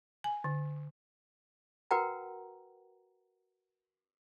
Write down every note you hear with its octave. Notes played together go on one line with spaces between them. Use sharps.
G#5
D3
F#4 A#4 B4 F#5 G5 A#5